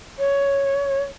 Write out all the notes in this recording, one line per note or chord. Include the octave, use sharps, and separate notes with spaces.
C#5